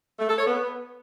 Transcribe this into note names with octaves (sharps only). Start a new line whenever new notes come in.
A3
A4
C#5
B3